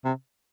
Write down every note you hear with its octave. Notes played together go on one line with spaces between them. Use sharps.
C3